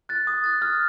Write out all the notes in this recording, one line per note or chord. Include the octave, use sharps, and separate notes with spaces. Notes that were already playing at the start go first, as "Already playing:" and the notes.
F#6 A6
D#6
F#6 A6
F6